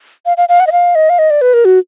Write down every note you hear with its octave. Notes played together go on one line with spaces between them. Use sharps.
F5
F5
F5
F#5
D#5
F5
D#5
F5
D#5
D5
B4
A#4
F#4